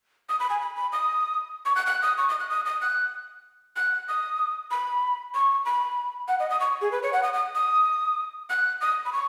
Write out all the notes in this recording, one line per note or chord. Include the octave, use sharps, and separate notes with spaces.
D#6
B5
G#5
B5
B5
D#6
C#6
F#6
F#6
D#6
C#6
D#6
F#6
D#6
D#6
F#6
F#6
D#6
B5
C#6
B5
F#5
D#5
D#6
C#6
G#4
B4
C#5
F#5
D#6
D#6
D#6
F#6
D#6
B5
C#6